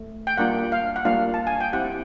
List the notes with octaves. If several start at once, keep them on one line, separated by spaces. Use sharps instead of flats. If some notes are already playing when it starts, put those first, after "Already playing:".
Already playing: A3
G5
G3 A#3 D4 F4 F#5
F5
F#5
G3 A#3 D4 F4 F5
A5
G#5
G5
C4 E4 G4 F#5